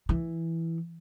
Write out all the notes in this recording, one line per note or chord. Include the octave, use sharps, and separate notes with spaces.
E3